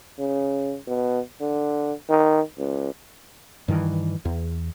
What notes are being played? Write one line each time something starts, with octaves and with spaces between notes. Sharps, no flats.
C#3
B2
D3
D#3
C#2
G2 D#3 E3
E2